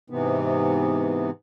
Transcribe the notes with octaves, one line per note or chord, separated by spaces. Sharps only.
G#2 C3 E3 B3